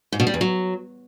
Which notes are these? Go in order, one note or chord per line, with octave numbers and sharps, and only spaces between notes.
G#2
B2
G3
E2
F#3